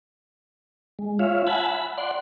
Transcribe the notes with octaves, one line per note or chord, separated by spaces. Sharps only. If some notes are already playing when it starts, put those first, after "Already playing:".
G#3
F4 C#5 E5 F5
E5 F#5 G#5 A5 B5
B5
D5 F#5 C6